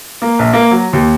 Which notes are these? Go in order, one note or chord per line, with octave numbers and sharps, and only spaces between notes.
A#3
A#1
A#3
F#3
D#2